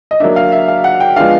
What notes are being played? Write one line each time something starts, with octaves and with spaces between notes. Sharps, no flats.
D#5
F#3 A#3 D4 E5
F5
E5
F5
F#5
G5
F3 G#3 B3 D4 F5